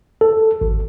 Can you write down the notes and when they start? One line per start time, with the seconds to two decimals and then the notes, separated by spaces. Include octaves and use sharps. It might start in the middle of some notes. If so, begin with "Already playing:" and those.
0.21 A4
0.61 G#1